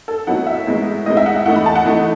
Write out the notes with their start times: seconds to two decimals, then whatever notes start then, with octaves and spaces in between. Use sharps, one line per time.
0.08 A4
0.27 A2 F#3 B3 D#4 F#5
0.47 E5
0.67 A2 G#3 B3 D#4
1.06 A2 G#3 B3 D#4 D#5
1.17 E5
1.26 F#5
1.36 E5
1.46 E3 A3 D#4 F#5
1.56 B5
1.66 A5
1.75 F#5
1.85 E3 A3 D#4